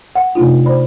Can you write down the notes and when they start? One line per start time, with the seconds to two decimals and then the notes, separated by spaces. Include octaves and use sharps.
0.15 F#5
0.35 C3 A3 D4 D#4 F4
0.66 C5 D5 B5